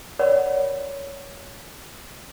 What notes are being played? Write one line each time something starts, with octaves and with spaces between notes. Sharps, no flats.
A#4 C#5 D5 F#5 B5